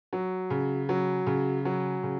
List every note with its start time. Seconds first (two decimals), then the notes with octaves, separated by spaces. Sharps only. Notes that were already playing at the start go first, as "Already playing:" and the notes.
0.13 F#3
0.50 C#3
0.89 F#3
1.27 C#3
1.65 F#3
2.03 C#3